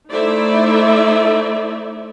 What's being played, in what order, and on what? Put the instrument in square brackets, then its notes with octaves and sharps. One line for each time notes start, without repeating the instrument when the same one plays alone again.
[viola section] A3 D#4 E4 C5 D5 E5